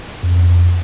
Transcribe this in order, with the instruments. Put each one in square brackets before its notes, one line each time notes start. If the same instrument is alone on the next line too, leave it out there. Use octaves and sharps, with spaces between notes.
[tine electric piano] F2